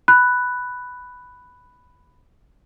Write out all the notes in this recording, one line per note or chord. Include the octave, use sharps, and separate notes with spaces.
B5 F#6